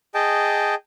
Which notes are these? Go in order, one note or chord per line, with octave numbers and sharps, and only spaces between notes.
G#4 D#5 G5 A5